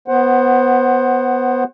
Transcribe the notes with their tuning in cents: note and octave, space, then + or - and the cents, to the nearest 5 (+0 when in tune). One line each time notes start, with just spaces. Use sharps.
B3 +0 C5 +20 F#5 +15